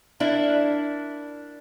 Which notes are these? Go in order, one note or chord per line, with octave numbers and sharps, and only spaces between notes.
A#3 D4 E4